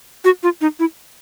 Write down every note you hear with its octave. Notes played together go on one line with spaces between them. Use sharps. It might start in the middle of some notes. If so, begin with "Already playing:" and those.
F#4
F4
D#4
E4